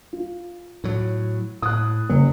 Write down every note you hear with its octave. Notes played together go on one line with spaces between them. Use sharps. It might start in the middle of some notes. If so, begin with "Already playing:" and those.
F4
A2 F#3
A2 D#6 F#6
F#1 F#3